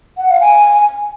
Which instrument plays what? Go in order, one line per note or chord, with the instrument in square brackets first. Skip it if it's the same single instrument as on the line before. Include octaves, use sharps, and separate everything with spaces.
[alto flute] F#5
F5
G#5